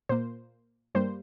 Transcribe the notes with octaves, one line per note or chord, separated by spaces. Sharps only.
A#2 A#3 C5
G2 G3 A#3 C5